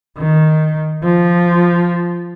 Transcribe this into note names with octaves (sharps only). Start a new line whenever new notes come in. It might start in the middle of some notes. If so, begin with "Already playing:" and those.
D#3
F3